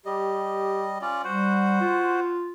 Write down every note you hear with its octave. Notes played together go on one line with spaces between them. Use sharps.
G3 G4 D#5
C#4 F4 D5
G3 F#4 C5 F#5
F4